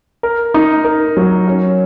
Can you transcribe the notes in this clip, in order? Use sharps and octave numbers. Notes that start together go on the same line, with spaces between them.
A#4
D#4
A#4
F#3
C#4